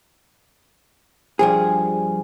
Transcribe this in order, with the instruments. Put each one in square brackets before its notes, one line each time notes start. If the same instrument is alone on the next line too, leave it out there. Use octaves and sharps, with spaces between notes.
[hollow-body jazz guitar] G2 F3 G#4